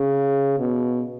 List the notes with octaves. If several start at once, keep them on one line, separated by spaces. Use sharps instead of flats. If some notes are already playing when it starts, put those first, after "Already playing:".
Already playing: C#3
B2